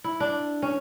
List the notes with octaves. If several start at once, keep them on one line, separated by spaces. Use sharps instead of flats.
E4
D4
C#4